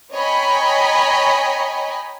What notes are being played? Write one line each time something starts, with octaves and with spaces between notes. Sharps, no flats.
C#5 D#5 G5 G#5 A#5 B5